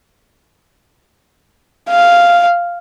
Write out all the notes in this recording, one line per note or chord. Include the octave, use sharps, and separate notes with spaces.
F5